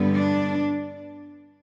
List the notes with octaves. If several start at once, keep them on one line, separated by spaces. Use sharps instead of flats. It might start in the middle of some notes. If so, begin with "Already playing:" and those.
Already playing: G2 D3 G3 B3
D4